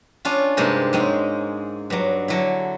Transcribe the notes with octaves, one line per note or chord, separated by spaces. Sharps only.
C#4 D4 F4
G2 C3 G#3 A#3 C4 D#4
G#2 G#3 C4 C#4
G2 F#3
D3 F#3 E4